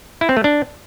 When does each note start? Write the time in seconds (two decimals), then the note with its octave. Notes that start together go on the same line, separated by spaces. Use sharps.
0.21 E4
0.29 C4
0.37 A3
0.44 D4